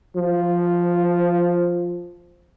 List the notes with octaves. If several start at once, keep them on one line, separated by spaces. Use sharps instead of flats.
F3